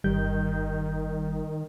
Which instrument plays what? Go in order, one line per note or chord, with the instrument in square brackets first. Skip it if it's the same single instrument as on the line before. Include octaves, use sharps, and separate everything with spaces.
[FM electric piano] G1 G3 G6 [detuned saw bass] D#3